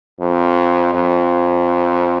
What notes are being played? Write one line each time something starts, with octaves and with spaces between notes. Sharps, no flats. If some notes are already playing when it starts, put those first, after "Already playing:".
F2
F2